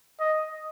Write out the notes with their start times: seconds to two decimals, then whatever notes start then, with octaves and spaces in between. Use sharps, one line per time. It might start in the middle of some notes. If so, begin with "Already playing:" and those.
0.20 D#5